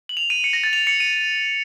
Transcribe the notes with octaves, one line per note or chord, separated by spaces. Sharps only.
F#7
F7
D#7
C#7
A#6
A6
F7
C#7
D#7